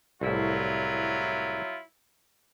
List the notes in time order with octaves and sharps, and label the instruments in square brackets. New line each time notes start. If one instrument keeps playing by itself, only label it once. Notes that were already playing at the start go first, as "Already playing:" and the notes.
[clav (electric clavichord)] C2 A2 [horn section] F#3 E4 F4